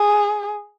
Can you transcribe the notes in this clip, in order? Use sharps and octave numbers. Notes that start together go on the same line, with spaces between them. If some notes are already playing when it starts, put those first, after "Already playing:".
Already playing: G#4